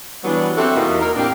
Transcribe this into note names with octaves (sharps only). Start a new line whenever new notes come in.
E3 F#3 G3 B3 D4
C4 F#4 G4 A4 E5
E2 B2 E3 A#3 D#4
A#3 D#4 A#4
A2 A#3 C4 D4 G4